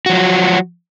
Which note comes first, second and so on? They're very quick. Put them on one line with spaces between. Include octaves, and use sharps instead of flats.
F#4 F3 F#3